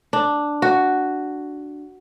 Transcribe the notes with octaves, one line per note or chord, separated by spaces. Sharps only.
D4
F#4